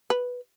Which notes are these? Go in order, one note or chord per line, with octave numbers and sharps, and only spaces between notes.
B4